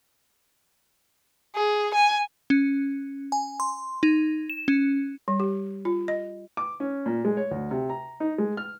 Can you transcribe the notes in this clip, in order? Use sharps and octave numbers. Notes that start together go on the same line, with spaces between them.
G#4
G#5
C#4
G#5
C6
D#4
E7
C#4
G3
G4
F4
D#5
D6
C#4
A#2
G#3
C#5
D2
C3
A#5
D#4
G#3
F6